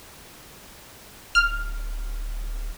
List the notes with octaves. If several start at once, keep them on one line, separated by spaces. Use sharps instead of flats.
D1 F6